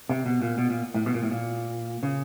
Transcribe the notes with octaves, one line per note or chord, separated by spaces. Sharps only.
C3
B2
A#2
B2
A#2
A2
B2
A#2
A2
A#2
C#3